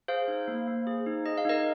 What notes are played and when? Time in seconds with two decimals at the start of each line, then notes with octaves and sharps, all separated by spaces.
0.08 G#4 C5 F5
0.28 D#4
0.48 A#3
0.67 A#3
0.87 G#4
1.06 D#4
1.26 G#4 D#5
1.38 F5
1.45 D#4 A#4 D#5